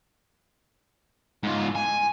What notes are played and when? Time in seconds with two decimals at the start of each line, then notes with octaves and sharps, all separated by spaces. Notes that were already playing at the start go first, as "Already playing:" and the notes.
1.43 G#2 F4
1.75 G#5